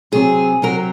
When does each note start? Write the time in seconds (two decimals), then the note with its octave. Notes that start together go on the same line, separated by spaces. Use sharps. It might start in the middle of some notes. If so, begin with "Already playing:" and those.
0.12 C3 F#3 C4 G#4
0.62 C3 F#3 C4 A#4